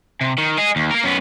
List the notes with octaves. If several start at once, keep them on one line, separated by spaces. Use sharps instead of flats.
C3
D#3
G#4 D#5
D#2
A#3 A#4
F#2 B3